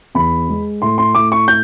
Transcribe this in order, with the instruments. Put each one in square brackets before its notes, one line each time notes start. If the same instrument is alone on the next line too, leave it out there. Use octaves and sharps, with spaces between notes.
[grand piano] E2 B5
G#3
A2 C6
C6
A2 D6
C#6
G6